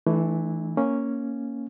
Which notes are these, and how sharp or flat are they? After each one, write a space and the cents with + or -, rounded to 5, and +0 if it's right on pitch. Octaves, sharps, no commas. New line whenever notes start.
E3 +0 A3 -20 D4 +45
A#3 +0 C#4 +0